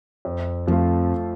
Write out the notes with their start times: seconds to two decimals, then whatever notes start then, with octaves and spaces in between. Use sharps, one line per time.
0.25 F2
0.67 F2 F3 A3 F4